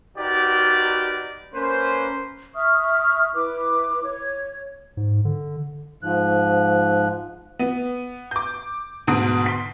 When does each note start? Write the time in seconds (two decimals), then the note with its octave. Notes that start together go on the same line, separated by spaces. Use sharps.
0.18 D#4 F#4 G4 A#4 B4 D5
1.54 A#3 C#4 B4 C5
2.55 E5 C#6 D#6 F6
3.34 E4 B4 D6
4.03 C#5
4.97 G#2
5.25 D3
6.03 G#2 F3 F#6
7.59 B3
8.31 D6 G6
9.07 D2 G#2 B2 D#6 D7
9.46 C6 B6